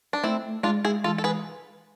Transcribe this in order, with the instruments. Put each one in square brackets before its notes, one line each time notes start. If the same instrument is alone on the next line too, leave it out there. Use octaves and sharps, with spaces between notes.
[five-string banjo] D4
[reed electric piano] A3 [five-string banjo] C4 E4
[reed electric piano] G#3 [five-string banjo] D4 F4
[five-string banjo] E4 G#4
[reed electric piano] E3 [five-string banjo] F4 A4
[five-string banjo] A4
G#4 B4